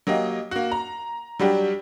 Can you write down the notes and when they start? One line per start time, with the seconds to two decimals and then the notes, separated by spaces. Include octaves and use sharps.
0.07 F#3 A#3 G4 D#5
0.51 A#3 F#4
0.72 A#5
1.40 F#3 G3 D4 G4